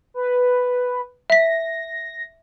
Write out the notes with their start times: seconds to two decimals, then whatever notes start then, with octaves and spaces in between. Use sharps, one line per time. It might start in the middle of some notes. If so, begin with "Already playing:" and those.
0.14 B4
1.30 E5 A#6 B6